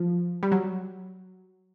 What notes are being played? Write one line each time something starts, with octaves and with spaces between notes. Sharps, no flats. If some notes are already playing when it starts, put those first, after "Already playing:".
Already playing: F3
G3
F#3